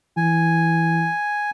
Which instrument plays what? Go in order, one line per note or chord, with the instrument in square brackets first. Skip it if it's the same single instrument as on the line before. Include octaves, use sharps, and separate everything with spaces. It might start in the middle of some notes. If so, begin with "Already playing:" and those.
[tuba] E3 [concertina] G#5